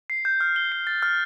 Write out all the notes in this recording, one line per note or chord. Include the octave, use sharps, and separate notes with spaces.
C7
G6
F6
G7
C7
A6
F6